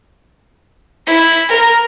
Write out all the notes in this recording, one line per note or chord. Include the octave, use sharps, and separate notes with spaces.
E4
A#4